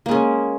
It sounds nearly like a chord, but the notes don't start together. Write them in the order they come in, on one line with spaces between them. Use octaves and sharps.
A#3 G#3 C#4